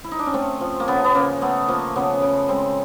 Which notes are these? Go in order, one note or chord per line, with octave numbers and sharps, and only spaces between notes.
E4
D#4
D4
C#4
A3 C4
F3
A#3
C#3 B3
B3
C#3 A#3
A3 B3
F3 A#3
C#3 B3
C#3
G#3 C4